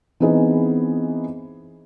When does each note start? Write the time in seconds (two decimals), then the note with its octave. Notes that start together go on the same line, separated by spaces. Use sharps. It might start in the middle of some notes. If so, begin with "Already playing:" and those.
0.20 E3 B3 C4 D#4 G#4 D#5